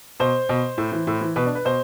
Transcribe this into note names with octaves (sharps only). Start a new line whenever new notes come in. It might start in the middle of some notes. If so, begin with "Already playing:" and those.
B2 C5
B2
A2
E3
A2
E3
B2 B4
D4
B4
B2 C5